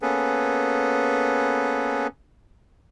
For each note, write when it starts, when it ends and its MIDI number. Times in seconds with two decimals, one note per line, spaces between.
0.02 2.07 58
0.02 2.07 59
0.02 2.07 61
0.02 2.07 68
0.02 2.07 69
0.02 2.07 71